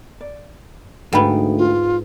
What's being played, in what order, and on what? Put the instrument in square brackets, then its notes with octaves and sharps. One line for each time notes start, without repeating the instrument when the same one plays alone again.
[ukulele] D5
[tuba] D2 [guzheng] G#2 B3 [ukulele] F5 G5 B5
[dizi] F4